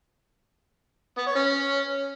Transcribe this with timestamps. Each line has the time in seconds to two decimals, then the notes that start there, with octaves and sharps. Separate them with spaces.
1.17 B3
1.26 C#5
1.35 C#4